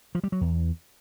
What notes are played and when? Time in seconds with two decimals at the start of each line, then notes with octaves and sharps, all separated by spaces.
0.15 F3
0.24 G3
0.32 F#3
0.41 E2